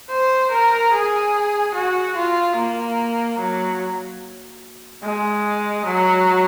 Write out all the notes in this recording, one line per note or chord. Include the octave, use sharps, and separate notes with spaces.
C5
A#4
G#4
F#4
F4
A#3
F#3
G#3
F#3